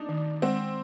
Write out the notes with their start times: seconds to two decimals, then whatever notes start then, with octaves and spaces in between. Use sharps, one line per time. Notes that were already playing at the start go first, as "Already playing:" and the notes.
Already playing: D4 D#4
0.09 D#3
0.42 G#3 C4